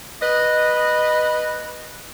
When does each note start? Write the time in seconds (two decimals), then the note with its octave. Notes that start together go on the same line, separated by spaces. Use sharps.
0.22 B4 D#5